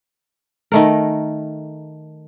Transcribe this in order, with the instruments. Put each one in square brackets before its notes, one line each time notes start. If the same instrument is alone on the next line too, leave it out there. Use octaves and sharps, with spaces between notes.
[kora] D#3 A3 A#4